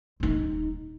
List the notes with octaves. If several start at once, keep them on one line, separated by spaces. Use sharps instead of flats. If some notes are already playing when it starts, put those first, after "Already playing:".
D#1 D#4